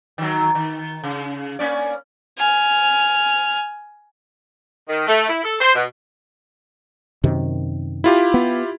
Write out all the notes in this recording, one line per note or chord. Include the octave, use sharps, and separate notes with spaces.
D#3 F#3
D#3
C#3
A#3 C#4 D5
G#5 F6
D#3
A3
E4
A4
C5
B2
F#2 C3 D#3
E4 F4 G4
B3